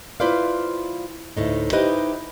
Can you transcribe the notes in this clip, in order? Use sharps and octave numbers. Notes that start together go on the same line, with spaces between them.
E4 F4 B4 C5 D5 F5
D2 A2 D#4
D#4 E4 G4 B4 C5 D#5